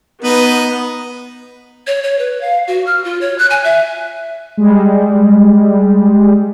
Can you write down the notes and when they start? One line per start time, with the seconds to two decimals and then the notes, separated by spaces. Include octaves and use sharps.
0.24 B3 D#4 B4
1.87 C#5
2.03 C#5
2.19 B4
2.41 F5
2.67 F#4
2.87 F6
3.04 F4
3.21 C#5
3.38 F#6
3.50 G#5
3.64 E5
4.57 G3 G#3